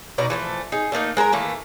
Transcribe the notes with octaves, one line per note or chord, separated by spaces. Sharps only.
B2 D#4 D5 A#5
E3 F3 A3
D#4 G#4
D3 A3 A#3 D#4
G#3 A#4 A5 A#5
D#3 E3 A3 A#3